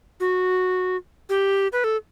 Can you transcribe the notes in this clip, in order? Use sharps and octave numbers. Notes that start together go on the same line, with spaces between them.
F#4
G4
B4
A4